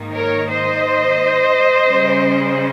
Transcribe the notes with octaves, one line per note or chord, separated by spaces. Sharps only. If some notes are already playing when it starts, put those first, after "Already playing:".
Already playing: G#2 D#3 A#3 D#4
A#4 C#5
C5 D#5
C#3 G3 C#4